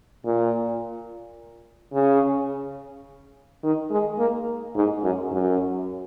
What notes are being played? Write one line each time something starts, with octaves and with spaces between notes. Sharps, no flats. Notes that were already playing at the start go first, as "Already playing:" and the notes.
A#2
C#3
D#3
G#3
A#3
G#2
F#2
F#2